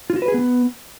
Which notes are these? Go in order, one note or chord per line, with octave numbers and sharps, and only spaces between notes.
F4
F#4
B4
G#4
B3